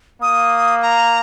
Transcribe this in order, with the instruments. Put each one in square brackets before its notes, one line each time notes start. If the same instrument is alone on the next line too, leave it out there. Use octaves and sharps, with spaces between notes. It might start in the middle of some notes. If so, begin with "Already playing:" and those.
[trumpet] A#3 [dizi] D#6
[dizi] A#5